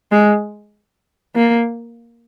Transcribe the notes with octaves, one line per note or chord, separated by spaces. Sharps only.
G#3
A#3